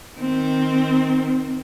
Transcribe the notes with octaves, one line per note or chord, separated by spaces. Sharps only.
D#3 C4